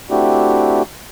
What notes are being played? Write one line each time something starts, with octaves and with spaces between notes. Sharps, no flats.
A3 C4 D4 E4 F#4 G4